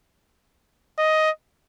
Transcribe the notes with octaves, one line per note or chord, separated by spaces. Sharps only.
D#5